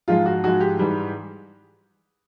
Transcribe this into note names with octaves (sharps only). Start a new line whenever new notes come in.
G#2 F3 G#3 F4
F#4
G#2 F3 G#3 F#4
G4
G#2 E3 G3